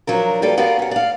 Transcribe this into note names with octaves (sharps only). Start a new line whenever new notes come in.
F3 F#3 D4 A#4
G3 A#3 G4 A4 B4 D5
B3 F#4 G4 A#4 D5 F5
C#4 F#5
D5 F5